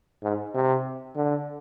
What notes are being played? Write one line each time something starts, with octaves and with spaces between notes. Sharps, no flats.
G#2
C3
D3